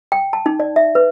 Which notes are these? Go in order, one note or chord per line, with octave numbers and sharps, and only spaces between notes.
G5
A5
D#4
D5
E5
B4